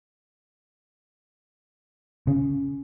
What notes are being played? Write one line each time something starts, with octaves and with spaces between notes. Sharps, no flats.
C#3